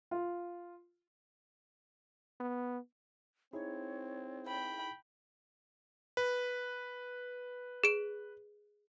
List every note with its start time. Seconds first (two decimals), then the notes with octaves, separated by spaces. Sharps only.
0.11 F4
2.40 B3
3.53 C4 D#4 E4 G#4 C#5
4.47 G5 B5
6.17 B4
7.84 G#4 D7